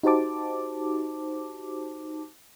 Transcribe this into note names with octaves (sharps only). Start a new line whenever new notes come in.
D#4 F#4 G4 C5 A5 D6